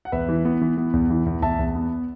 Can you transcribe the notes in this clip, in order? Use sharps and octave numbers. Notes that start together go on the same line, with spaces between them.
F#5
E2 B4 E5
E3
B3
E3
B3
E2
E3
E2
E2 E5 A5
E2
B3